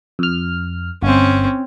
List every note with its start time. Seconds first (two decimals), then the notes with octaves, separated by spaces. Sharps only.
0.19 F2 F6
1.02 G1 C4 C#4